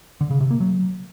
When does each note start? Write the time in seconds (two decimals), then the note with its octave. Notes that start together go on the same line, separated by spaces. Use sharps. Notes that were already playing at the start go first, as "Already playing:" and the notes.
0.21 D3
0.31 C#3
0.41 C3
0.51 A#3
0.60 F#3